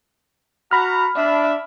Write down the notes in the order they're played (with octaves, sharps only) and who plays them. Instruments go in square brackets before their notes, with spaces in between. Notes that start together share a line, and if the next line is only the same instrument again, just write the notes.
[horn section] F#4 A#5 [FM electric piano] B5 F6
[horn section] D4 [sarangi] E5